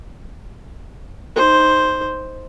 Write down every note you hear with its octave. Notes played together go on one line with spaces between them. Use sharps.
D#4 C5